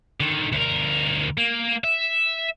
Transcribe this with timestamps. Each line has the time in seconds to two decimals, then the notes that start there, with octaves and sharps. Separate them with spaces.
0.20 D3 D#3
0.52 D2 A#4
1.37 A#3
1.84 E5